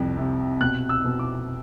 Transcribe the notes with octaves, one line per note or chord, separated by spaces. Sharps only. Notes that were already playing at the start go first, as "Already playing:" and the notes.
Already playing: C2 F2
C3
B2 F#6
E6
B2
D6